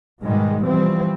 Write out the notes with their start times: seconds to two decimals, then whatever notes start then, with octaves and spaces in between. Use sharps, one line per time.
0.22 G#2 B2 D#3 G3 G#3
0.65 B2 E3 F3 G3 C4